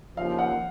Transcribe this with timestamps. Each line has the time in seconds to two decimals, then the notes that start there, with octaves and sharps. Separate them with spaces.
0.16 D#2 C#3 F3 F5
0.39 F#5